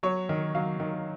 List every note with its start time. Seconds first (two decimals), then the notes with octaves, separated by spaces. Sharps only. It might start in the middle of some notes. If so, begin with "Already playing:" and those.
0.03 F#3 C#5
0.29 D#3
0.55 F#3 F5
0.80 D#3